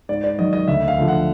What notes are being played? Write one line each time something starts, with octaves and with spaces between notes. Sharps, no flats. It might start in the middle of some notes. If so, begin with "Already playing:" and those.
G#2 D5
D5
D#3 F#3 D#5
D#5
D2 E5
F5
D3 F3
F#5